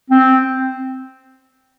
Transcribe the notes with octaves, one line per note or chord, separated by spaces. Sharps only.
C4